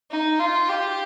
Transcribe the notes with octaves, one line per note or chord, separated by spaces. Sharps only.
D#4
F4
G4